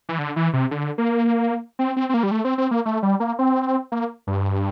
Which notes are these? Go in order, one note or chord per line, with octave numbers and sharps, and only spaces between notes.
E3
D3
E3
C3
D3
A#3
C4
C4
C4
A#3
G3
A3
C4
C4
A#3
A3
G3
A#3
C4
A#3
G2